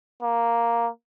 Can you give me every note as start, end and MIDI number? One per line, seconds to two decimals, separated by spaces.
0.23 0.89 58